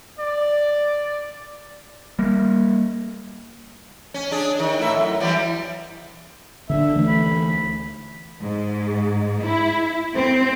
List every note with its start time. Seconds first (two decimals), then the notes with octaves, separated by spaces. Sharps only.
0.20 D5
2.19 G3 A#3
4.14 C#4
4.31 D4 G#4
4.59 D#3
4.79 A2 E5
4.97 F#2
5.20 E3 F#3 G3
6.70 D3 C4 D4 E5
6.95 D2 E3 A3
7.08 B5
8.41 G#2
9.43 E4
10.14 C4